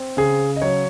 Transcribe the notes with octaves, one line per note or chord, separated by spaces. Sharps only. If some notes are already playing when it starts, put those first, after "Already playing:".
Already playing: C4
C#3 G#4
D#5
F#3 C#5